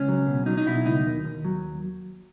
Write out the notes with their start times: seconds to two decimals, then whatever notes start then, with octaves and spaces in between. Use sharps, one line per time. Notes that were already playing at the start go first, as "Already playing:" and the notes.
Already playing: C#2 C#4
0.09 F#3
0.27 B2
0.46 F#3 D#4
0.57 D#4
0.66 B2 E4
0.85 C#2 D#4
1.05 D#2
1.25 D#2
1.45 F#3